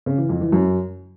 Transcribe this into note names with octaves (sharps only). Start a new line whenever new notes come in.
C#3
E3
F2
E3
F#2